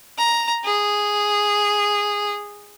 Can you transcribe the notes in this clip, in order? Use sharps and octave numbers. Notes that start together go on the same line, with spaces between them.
A#5
G#4